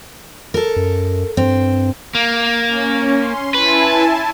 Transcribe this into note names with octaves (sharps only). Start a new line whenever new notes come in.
A4 A#4
F#2
G2 C4
A#3
C#4
C6
E4 B4 G#5 A5